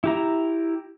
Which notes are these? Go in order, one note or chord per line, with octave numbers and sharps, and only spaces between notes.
E4 G4 A#5